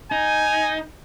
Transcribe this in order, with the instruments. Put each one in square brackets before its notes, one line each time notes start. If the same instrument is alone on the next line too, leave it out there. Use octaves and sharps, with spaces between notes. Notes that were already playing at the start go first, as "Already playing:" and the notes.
[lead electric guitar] D#4 [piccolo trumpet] G#5